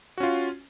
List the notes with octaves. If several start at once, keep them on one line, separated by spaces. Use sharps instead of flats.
C#4 F4 F#4